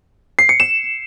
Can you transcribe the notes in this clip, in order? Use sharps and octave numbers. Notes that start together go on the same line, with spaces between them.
C7
C#7
E7